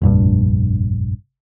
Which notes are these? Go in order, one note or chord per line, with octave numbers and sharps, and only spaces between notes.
F1 A#1 G2